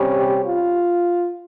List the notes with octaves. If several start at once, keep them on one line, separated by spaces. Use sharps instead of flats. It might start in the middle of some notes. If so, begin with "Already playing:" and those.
Already playing: C3 G3 C#4
G4
F4